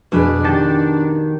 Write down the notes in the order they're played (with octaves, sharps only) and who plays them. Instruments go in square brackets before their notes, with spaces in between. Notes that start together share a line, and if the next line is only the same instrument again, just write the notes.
[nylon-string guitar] F2 G#4 B4 [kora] B2 [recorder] D4
[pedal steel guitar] D#3 A5 [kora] G4